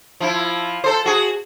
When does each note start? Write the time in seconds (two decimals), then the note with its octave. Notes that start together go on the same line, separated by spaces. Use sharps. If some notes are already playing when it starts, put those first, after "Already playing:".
0.20 F3 E4
0.84 A4 C5
1.06 F#4 G#4